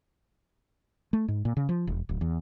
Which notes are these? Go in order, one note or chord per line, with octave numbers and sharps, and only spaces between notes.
A3
G#2
A#2
C#3
F3
E1
D1
E2